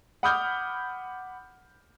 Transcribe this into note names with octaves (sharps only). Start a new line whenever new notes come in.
F#5 B5 D6 D#6 F6 G6